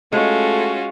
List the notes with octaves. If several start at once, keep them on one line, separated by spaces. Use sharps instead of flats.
G#3 A3 C#4 F4 F#4